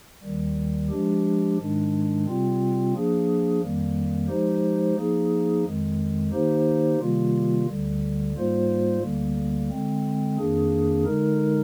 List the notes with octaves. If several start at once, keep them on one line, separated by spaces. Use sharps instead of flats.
D#2 D#3 G3
F3 G#3 D4 G4
G#2 D#3 G#3 D4
C3 G3 C4 F4
F3 A#3 D4 G#4
F2 D#3 G3 A#3
F3 G#3 D#4 G4 C5
F3 A#3 D#4 G#4
F2 D#3 G#3
D#3 A#3 D#4 G4 C5
C3 D#3 G3 A#3 F4
D2 D3 G3
G#2 G3 A#3 F4 C5
D2 D3 G3 A#3
D3 G#3 C4
F2 D#3 A#3 D4 G#4
D3 G#3 D#4 A#4